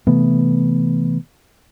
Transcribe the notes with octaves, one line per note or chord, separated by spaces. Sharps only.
C3 E3 A3 B3